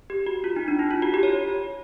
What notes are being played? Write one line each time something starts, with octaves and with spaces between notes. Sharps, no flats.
G4
F#4
F4
D#4
D4
E4
F4
F#4
G4
C#5